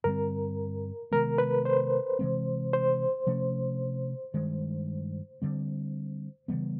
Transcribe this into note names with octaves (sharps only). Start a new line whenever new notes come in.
G2 D3 G3 C4 A#4
C3 D#3 G#3 B3 A#4
B4
C5
C3 E3 G#3 C4
C5
C3 F3 A3 C#4
G2 D#3 G#3
D3 G3 C4
C#3 E3 G3 B3